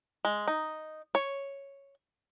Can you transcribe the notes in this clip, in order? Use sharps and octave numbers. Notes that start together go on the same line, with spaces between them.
G#3
D#4
C#5